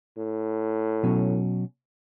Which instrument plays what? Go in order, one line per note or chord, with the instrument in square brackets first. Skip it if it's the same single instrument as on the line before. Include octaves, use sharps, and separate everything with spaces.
[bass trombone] A2
[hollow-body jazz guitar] B2 F#3 C#4